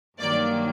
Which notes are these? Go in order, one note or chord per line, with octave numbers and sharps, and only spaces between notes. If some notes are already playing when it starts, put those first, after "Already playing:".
G2 D#3 F#3 A#3 D5